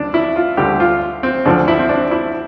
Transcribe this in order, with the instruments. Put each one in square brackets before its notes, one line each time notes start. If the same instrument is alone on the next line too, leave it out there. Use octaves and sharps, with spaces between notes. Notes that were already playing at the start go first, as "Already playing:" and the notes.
Already playing: [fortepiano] D2 G3 D4
E4
F4
D2 D3 G3 G4
F4
C4
D2 D3 F3 D4
E4
C4
D4
E4